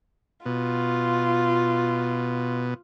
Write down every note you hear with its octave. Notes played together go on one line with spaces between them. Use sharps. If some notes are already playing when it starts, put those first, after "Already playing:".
B2 F4